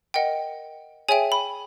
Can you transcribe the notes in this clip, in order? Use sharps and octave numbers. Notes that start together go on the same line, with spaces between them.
A#4 D#5 F#5 G5
G#4 C#5 E5 G5 G#5
B5